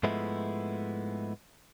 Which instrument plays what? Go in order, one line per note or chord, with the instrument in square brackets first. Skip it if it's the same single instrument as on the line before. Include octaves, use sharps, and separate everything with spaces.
[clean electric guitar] G#2 F3 G#3 A3 B3 E4